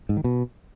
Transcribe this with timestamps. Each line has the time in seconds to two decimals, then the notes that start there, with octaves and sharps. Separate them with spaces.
0.09 G#2
0.17 D#3
0.24 B2